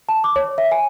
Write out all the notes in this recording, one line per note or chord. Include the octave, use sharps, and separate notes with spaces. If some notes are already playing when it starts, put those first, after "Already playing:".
A5
D6
C#5
E5
G#5